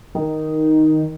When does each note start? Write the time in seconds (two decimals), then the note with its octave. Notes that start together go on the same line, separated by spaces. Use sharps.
0.15 D#3